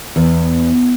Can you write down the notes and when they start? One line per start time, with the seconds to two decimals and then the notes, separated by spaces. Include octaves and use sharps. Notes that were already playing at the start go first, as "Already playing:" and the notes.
0.16 E2